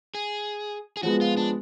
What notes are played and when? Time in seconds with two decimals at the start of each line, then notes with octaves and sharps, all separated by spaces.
0.15 G#4
0.97 G#4
1.03 F3 G#3 B3 F#4
1.21 F4
1.37 D4